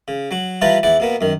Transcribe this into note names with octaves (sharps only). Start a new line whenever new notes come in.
C#3
F#3 F#4
E3 G3 F4 B4 A5 A#5
E2 E4 D5 F#5
B2 A#3 B3
F#2 D#3